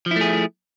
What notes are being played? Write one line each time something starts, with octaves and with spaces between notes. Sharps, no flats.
F3 A3 E4 G#4